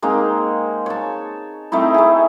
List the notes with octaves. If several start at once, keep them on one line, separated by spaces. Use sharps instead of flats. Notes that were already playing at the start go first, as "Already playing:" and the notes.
G#3 A#3 C4 D#4
C#5 A5
A3 C4 D#4 E4
A3 G#4